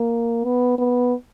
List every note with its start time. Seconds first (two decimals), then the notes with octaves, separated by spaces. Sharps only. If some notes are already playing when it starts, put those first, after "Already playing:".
Already playing: A#3
0.44 B3
0.78 B3